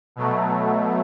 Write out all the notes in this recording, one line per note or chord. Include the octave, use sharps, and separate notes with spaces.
B2 F#3 A3